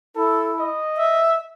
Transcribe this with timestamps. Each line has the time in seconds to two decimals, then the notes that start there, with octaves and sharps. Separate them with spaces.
0.16 E4 A4
0.60 D#5
0.97 E5